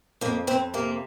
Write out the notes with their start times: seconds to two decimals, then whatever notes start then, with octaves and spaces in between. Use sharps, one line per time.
0.21 F2 A#3
0.47 F2 C4
0.74 C3 A#3